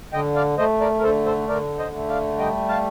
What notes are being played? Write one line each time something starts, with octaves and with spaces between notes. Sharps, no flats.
D3 D#5 G5
D5 F5
A3 C5 D#5
A#4 D5
A#4
D3 A4 C5
A4 C5
D3 A#4 D5
C5 D#5
A3
D5 F5
G3 D#5 G5
F5 A5